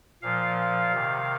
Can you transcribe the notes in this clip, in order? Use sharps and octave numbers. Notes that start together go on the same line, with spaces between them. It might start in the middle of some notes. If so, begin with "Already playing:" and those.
A#2 F3 F5
C3 D#3